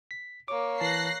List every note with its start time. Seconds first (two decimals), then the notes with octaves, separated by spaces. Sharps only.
0.11 B6
0.48 A#3 C#5 D6
0.80 E3 A5 F#6 A#6 C7